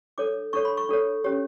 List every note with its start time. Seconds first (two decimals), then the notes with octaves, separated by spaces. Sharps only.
0.18 D4 A4 C#5 D6
0.53 D4 A4 C#5 C#6
0.65 B5
0.77 C#6
0.89 D4 A4 C#5
1.24 C#4 G4 C#5